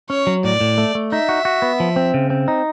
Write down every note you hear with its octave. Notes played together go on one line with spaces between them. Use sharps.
C#4 C#5
F#3
A2 D5
A2
A3
A3
D#4 E5
F#4
F#4
B3
F3
C4
C#3
C4
D#4